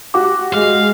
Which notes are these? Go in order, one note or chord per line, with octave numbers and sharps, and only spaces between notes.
F#4 G4 D6
G#3 F5